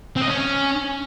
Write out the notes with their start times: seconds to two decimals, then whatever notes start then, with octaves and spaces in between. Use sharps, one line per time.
0.17 C4
0.22 D#5
0.28 C#4